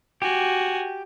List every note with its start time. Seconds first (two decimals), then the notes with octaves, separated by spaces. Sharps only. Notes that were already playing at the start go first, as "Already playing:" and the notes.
0.22 F#4 G4 G#5